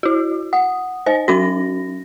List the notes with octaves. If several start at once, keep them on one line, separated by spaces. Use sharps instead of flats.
E4 F#4
F#5 D#6
D#4 C5 D#5 G#5
F#3 C#4 F#4 A#6